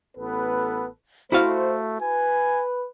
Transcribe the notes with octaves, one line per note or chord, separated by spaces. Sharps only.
A1 B3 A4 B4
A3 E4 F#4 C5 F5
B4 G#5